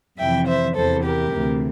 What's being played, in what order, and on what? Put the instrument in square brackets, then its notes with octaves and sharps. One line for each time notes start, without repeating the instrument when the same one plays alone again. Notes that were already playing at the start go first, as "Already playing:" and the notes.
[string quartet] F2 C3 E3 E5 G5
C5 E5
E2 C3 E3 A4 C5
G4 A#4
D2 C3 E3